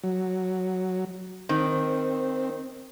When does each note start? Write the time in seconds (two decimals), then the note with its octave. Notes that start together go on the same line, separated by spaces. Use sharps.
0.03 F#3
1.49 D#3 C4